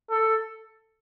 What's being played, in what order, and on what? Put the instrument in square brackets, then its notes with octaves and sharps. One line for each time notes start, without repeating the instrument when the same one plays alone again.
[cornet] A4